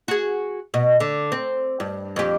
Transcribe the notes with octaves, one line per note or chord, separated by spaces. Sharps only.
F#4 G#4
B2
D3
C4
G2
F2 G4